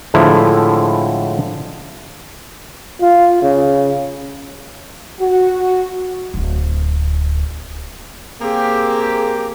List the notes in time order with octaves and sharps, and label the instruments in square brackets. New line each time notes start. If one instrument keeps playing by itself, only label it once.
[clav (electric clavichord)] A2 D3 F3 G#3 E4
[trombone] F4
C#3
[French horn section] F#4
[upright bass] D1 G#1
[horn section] A#3 C4 G4 [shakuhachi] G#4